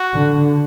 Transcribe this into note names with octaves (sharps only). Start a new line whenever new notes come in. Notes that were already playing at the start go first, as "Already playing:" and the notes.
Already playing: F#4
D3